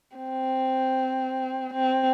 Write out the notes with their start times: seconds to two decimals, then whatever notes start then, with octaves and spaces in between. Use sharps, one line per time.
0.16 C4
1.74 C4